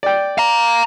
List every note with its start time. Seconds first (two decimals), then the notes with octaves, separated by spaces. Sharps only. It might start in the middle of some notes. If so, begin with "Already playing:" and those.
0.03 D5 G5
0.38 F5 A#5